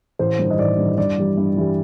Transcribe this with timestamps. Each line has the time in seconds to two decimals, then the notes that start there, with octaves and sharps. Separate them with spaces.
0.19 A1 C5
0.39 G2 D#3
0.50 D#5
0.58 A1 D5
0.78 G2 D#3
0.98 G2 D5
1.18 E3 G3
1.37 G2
1.57 E3 G3